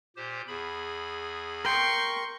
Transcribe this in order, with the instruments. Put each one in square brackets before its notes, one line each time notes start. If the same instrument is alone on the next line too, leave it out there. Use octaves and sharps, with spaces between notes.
[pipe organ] A#2 G4 C5
E2 G#4 B5
[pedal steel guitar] A#4 G5 [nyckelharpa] C6 C#6